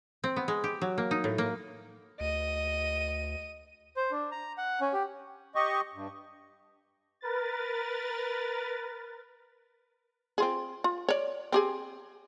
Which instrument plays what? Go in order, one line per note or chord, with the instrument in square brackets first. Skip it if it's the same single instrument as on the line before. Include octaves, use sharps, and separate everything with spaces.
[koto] C4
B3
G#3
G4
F#3
A#3
D#4
A2
A#3
[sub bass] D2 [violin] D#5 D#7
[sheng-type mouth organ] C5
D4
A#5
F#5
C#4
G4
[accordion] G4 D#5 C#6
G2
[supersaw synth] A#4 B4 A6
[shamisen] C4 F4 G#4
F4
C#5 D5
C4 G4 G#4